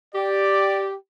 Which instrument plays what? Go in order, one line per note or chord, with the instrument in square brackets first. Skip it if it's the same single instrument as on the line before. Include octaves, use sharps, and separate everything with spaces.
[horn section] G4 [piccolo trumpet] D5